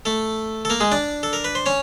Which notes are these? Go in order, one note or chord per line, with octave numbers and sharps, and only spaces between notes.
A3 A4
A4
A#3 A#4
G#3 G#4
D4 D5
A4
A#4
B4
C5
C#4 C#5